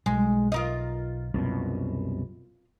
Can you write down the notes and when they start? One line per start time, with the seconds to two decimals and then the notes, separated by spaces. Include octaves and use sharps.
0.06 B1 G#3
0.52 F4 A#4 D#5
1.34 C2 F#2 B2